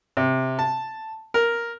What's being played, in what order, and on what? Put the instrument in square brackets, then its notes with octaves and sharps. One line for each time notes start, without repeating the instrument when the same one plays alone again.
[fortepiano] C3
A5
A#4